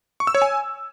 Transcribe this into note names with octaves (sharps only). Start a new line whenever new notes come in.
C#6
E6
C#5
G#5